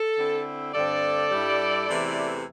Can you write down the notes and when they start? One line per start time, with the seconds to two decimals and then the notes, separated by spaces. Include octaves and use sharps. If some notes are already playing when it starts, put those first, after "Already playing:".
Already playing: A4
0.18 D3 C4 E4
0.74 G2 D3 C4 A4 D5
1.31 G2 G3 E4
1.88 E2 C3 E3 A3 E4